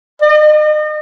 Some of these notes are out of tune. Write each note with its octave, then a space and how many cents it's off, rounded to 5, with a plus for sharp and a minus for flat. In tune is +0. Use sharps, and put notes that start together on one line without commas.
D#5 -40